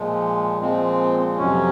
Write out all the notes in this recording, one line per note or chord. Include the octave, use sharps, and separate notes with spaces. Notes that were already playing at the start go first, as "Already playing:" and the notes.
Already playing: A#2 F3 G#3
A#2 F3 G#3 C4
F2 C3 F#3 C#4